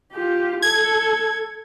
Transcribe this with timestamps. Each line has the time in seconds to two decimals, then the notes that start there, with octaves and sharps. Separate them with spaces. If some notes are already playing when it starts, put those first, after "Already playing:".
0.13 F4 G4
0.62 A4 G#6